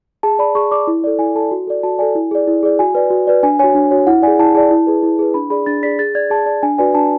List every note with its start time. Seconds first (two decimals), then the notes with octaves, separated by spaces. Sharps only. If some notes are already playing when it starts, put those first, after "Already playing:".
0.23 G#4 A5
0.39 D5 B5
0.55 G#4 C#6
0.71 D5 D6
0.87 E4
1.04 A4 D5
1.19 E4 G#5
1.35 A4 A5
1.40 D5
1.51 F#4
1.67 A4 D5
1.83 F#4 A5
1.99 A4 D5 G#5
2.15 E4
2.31 G#4 D5
2.47 E4
2.63 G#4 D5
2.79 F#4 G#5
2.95 B4 D5
3.11 F#4
3.27 B4 D5
3.43 D4 G#5
3.59 F#4 C#5 G#5
3.75 D4
3.91 F#4 C#5
4.07 E4 F#5
4.22 D5 G#5
4.27 G#4
4.39 E4 A5
4.55 G#4 D5 A5
4.71 E4
4.87 G#4 B4
5.03 E4
5.19 G#4 B4
5.34 D4 B5
5.50 G#4 D5 B5
5.66 D4 A6
5.83 G#4 D5 B6
5.99 G#4 A6
6.15 D5 G#6
6.30 G#4 A5
6.46 D5 A5
6.63 D4 G#5
6.78 F#4 B4 D5 G#5
6.95 D4 A5